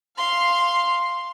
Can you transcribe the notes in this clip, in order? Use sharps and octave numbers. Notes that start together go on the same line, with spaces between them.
F5 C6